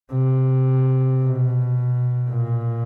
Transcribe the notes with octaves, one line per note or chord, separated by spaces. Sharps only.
C3
B2
A#2